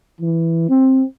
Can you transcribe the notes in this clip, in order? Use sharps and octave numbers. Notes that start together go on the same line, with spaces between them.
E3
C4